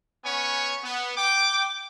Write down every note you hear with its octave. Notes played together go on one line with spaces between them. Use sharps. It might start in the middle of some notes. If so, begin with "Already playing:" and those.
B3 C#4 C#5 G#5 C#6
B3
G5 D6